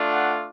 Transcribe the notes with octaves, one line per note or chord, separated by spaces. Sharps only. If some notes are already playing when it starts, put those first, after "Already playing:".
Already playing: A3 D4 F4
F#5